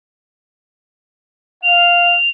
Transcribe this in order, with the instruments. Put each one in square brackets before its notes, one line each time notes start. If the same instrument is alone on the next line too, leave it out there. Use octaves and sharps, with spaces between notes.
[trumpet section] F5 [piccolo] F7